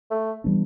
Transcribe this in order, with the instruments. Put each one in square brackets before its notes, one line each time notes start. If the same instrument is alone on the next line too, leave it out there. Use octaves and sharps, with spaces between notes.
[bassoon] A3
[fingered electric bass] E3 G3 B3 D4